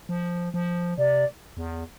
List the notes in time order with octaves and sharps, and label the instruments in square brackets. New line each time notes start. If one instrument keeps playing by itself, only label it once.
[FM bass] F3
F3
[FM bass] C3 [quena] D5
[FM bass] E2